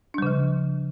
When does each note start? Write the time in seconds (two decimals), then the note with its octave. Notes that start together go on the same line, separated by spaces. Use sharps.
0.14 D4
0.18 G3
0.22 C#3
0.27 F3